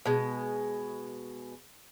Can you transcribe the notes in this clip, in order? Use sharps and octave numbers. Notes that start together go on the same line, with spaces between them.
B2 G#3